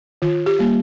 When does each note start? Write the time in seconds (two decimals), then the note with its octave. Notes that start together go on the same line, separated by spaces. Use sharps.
0.22 D#3 F4
0.46 G4
0.59 G3 A#3